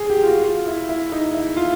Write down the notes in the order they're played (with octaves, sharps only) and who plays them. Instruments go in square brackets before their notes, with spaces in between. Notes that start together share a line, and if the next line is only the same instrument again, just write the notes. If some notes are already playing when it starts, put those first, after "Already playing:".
Already playing: [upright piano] G#4
G4
F4
F#4
F4
E4
E4
D#4
E4
F4